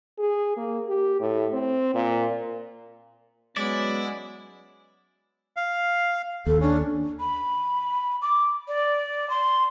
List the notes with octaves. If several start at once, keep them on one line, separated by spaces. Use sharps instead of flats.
G#4
A#3
G4
A2
C4
A#2
F#3 G#3 B3 C#4 E4 D5
F5
D#2 A4
C#4 D4
B5
D6
D5
C6